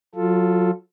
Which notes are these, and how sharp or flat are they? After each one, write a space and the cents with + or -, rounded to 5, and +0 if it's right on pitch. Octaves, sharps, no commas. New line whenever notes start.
F#3 -25 F4 +0 A4 +0